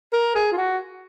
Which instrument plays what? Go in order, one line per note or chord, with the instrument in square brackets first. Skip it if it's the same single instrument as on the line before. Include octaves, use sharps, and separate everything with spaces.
[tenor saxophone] A#4
G#4
F4
F#4